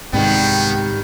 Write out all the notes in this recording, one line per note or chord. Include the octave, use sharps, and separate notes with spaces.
C2 G#2 D#3 G3 B3 C4 G5